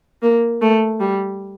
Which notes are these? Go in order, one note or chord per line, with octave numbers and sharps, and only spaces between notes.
A#3
A3
G3